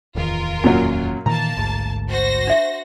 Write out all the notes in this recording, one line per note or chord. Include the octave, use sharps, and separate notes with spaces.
D1 E2 D#3 F4 A#4
F#2 A#2 F#3
A#2 D#3 E3 A#3 A5 A#5
A1 D2 G#2
F#4 C5 A#6
D4 E5